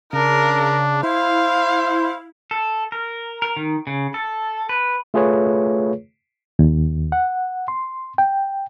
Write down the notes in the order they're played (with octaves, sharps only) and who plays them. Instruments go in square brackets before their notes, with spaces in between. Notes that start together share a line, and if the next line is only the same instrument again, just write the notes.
[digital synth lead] C#3 [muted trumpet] D4 [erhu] A#4
[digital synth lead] E4 [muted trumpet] C5 [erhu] F5
[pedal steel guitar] A4
A#4
A#4
D#3
C#3
A4
B4
[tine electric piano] A3 F4 G#4 B4 C#5
[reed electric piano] D#2
F#5
C6
G5